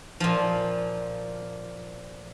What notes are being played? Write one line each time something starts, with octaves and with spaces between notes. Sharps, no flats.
A#2 F3